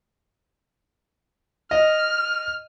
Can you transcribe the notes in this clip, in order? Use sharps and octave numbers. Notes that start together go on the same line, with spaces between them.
D#5 F6